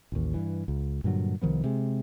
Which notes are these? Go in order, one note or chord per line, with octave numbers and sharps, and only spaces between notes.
A1 D#2
G2 E3
C#2
G2 A#2 D3 F#3
C2 D#3 F3 B3
C3 G#3